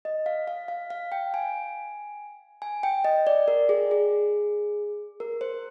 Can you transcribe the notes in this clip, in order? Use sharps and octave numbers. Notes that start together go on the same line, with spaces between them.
D#5
F5
F5
F5
F5
G5
G#5
G#5
G5
D#5
D5
A#4
G#4
G#4
A#4
C5